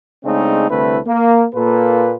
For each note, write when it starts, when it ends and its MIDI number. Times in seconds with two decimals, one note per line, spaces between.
0.25 0.66 49
0.25 0.66 56
0.25 0.66 57
0.25 0.66 60
0.25 0.66 62
0.25 0.66 63
0.70 0.99 36
0.70 0.99 50
0.70 0.99 57
0.70 0.99 60
0.70 0.99 64
0.70 0.99 71
1.06 1.45 58
1.55 2.15 46
1.55 2.15 58
1.55 2.15 65
1.55 2.15 69
1.55 2.15 71